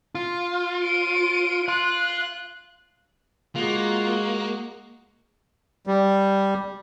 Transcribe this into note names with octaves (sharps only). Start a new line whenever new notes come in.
F4
D7 D#7
F5 C6 F#6
G#3 A#3 F4 F#4
G3